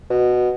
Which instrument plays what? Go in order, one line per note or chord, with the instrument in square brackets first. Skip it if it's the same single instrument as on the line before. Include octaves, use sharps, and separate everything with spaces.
[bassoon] B2